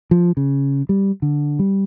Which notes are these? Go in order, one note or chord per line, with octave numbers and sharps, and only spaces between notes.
F3
C#3
G3
D3
G3